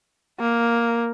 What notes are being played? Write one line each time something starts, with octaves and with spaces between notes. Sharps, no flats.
A#3